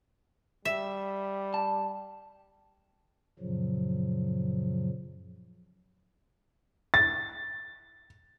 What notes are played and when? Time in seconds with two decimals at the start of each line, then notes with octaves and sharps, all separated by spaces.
0.65 G3 E5
1.54 A5
3.39 F#2 A#2 C#3 F3 F#3
6.94 A6